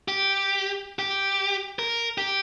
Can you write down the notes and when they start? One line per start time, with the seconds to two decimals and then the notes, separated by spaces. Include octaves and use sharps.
0.08 G4
0.99 G4
1.79 A#4
2.18 G4